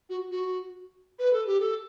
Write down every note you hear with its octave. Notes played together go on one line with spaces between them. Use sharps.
F#4
F#4
B4
A4
G4
A4